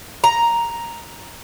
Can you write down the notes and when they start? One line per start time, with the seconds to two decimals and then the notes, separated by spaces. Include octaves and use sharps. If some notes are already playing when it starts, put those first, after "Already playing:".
0.24 A#5